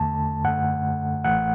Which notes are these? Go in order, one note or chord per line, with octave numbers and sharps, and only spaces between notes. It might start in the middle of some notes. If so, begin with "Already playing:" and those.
Already playing: E2 D3 A3 A5
F#2 D3 A3 F#5
A1 A2 E3 A3 F#5